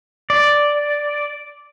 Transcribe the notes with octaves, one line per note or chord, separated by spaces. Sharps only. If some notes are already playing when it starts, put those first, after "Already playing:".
D5